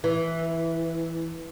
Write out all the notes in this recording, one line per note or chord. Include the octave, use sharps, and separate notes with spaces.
E3